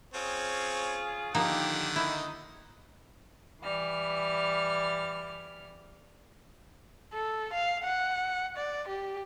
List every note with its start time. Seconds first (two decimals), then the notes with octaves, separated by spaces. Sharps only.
0.14 C4 C#4 F4 G#4 C#5
1.35 D3 D#3 F3 A#3 D#4 G4 F#5
1.96 D#4 E4
3.62 E3 G3 F6
7.14 A4
7.53 F5
7.84 F#5
8.57 D5
8.88 G4